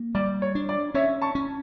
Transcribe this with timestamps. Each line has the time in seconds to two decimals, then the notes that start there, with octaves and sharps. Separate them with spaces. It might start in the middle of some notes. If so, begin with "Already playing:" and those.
Already playing: A#3
0.15 G3 D5
0.42 C#5
0.55 D4
0.69 D5
0.94 C#4 C#5 E5
1.22 A5 C#6
1.35 C#4